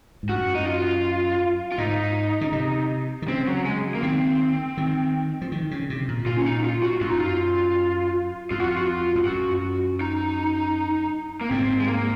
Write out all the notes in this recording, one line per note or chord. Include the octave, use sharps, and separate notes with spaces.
G#2
F#2 F#4
D#4
F4
F4
G#2 D#4
C#3
C3
D#3
C#3 C4
F#3
G#3
A#3
D#3 C4
D#3
F3
D#3
C#3
C3
A#2
A#2 F4
C#4
D#4
F4
F#4
F#2 F4
D#4
F4
F2 F4
F#4
F4
F#4
F4
F2
F#2 F#4
D#4
A#3
G#2 C4
G#3
A#3